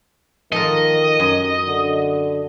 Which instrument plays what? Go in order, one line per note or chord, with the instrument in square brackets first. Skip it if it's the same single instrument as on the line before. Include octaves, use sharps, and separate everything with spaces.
[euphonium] D#3 [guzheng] F3 A4 A#4 [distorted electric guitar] D#5
[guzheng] F#2
[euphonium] D3